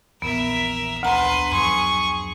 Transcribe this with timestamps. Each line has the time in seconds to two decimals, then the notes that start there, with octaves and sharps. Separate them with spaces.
0.22 A#1 E2 B3 A#4 E5
1.03 D2 B4 A#5 C6
1.52 F#2 F3 F#3 G#4 C6 C#6